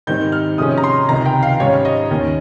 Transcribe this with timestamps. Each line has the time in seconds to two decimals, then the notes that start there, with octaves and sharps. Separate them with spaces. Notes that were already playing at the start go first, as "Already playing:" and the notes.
0.07 G#2 D#3 G3 C4 D#4 G6
0.32 F6
0.58 C3 F3 G#3 C#4 D#6
0.78 A#5
0.84 C6
1.09 C#2 C3 D#3 A#5
1.26 G5
1.43 F5
1.60 G#2 G3 C#4 C#5
1.85 D#5
2.11 D#2 D#3 A#3 C#4